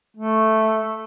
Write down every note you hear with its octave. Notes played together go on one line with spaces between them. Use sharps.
A3